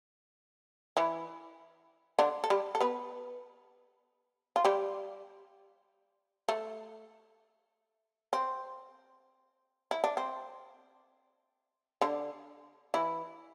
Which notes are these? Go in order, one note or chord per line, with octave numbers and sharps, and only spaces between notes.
E3 E4
D3 D4
A4
G3 G4
A4
B3 B4
F4
G3 G4
A3
C4
E4
D4
C4
D3 D4
E3 E4